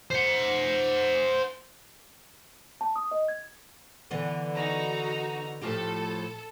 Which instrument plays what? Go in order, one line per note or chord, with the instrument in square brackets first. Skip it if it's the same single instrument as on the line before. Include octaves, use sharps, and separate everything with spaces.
[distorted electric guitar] C5 F#5
[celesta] A5
D#6
D#5
G#6
[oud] D3 E3 B3
[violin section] D#4 F#4 A#5
[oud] A2 F3 G4 [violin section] A4